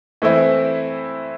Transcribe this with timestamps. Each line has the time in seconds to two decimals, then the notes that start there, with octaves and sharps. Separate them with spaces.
0.22 E3 A3 C4 E4